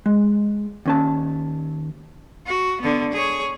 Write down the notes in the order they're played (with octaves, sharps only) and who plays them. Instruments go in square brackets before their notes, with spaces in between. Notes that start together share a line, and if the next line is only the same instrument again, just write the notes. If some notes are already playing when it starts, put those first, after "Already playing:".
[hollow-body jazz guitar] G#3
D#2 C#4 A5
[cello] F#4
D3 B3
G#4 C#5